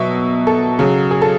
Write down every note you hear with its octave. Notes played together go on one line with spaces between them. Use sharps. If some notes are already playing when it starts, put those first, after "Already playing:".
Already playing: B2 F#3 E5
A4
C#3 F#3
G#4
A4